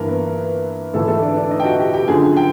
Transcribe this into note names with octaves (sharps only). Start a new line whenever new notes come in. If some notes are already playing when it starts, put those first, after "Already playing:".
Already playing: G2 E3 A#3 A#4
B3 B4
G#2 E3 A3 A4
A3 A4
D4 D5
D4 D5
D#4 D#5
G5
F#4 F#5
G4 G5
G4 G5
F#2 D3 F3 G#4 G#5
G5